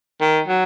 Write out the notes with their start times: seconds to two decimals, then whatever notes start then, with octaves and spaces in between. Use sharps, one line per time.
0.21 D#3
0.48 F#3